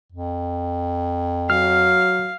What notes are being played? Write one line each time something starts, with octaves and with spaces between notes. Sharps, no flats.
F2
F#3 F5 F6